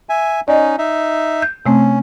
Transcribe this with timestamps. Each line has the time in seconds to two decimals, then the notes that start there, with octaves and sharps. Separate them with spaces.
0.09 E5 G#5
0.48 C#4 D#4 D5 D#5
0.78 D#4 E5
1.42 G6
1.66 C3 A3 C4 C#4